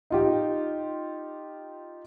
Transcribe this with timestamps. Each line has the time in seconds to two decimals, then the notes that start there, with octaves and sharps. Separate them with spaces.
0.10 D#4 F4 G4